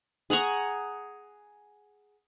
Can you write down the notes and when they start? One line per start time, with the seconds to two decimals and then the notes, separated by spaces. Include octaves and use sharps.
0.30 G#4 F#5 A#5 C#6